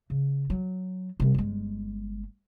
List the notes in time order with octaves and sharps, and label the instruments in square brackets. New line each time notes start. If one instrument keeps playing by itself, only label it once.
[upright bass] C#3
F#3
C3 G3
G1 G#3